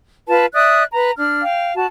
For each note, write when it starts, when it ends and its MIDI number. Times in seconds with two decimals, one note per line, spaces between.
0.28 0.46 65
0.28 0.46 71
0.28 0.46 81
0.54 0.84 74
0.54 0.84 76
0.54 0.84 87
0.54 0.84 90
0.92 1.12 71
0.92 1.12 82
1.18 1.42 62
1.18 1.42 89
1.43 1.74 77
1.43 1.74 79
1.75 1.86 66
1.75 1.86 81